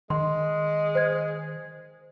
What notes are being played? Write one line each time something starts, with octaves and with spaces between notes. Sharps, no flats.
D#3 G#3 C6
C5 G#6